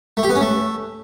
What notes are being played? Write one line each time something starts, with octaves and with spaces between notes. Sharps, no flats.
A3
G4
B3
C#4
A3